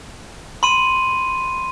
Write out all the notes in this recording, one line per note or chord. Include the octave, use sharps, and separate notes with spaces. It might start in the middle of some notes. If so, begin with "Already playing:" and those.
B5 C6 D#7